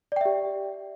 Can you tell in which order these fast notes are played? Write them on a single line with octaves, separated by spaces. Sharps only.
D5 G5 E5 G4